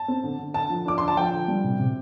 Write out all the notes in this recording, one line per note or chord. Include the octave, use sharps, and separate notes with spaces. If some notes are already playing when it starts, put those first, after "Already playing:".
Already playing: A5
C4
D3
D3
D3 A5
F3
D4 D6
D3 C6
A5
F3 G5
D3
G3
C3
C3